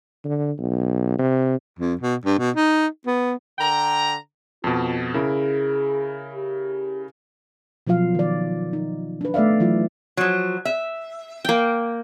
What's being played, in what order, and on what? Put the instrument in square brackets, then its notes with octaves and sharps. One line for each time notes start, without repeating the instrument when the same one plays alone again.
[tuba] D3
B1
C3
[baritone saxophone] F2
B2
G2
B2
D#4
B3
[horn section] D3 G5 A#5
[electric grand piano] F2 B2 [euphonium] F4
[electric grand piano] C#3 E4 A#4 [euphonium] G#4
[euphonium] G4
[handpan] B2 F3 F#3 F4 F5
D#3 D5
D#4
D4 B4
A3 B3 D5 E5 F5
E3 F#3 F4
[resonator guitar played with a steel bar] F3 F#3
E5
[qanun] A#3 G5